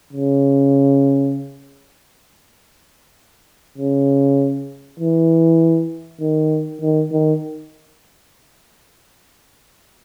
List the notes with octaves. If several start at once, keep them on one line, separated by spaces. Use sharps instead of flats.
C#3
C#3
E3
D#3
D#3
D#3